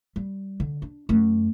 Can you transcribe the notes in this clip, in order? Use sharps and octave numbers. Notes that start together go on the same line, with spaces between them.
G3
D3
D4
F#2 A3